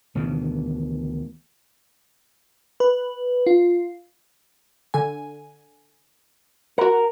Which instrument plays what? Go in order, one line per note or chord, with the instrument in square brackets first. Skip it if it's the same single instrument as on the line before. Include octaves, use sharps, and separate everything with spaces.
[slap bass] D2 B2 D#3 E3
[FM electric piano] B4
F4
[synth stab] D3 G#5
[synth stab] F#4 F#5 [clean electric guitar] A#4